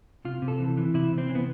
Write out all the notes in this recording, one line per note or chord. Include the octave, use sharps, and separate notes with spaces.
C3 F4
C3
A4
E3
E3
C3 E4
C3
C4
E3
B3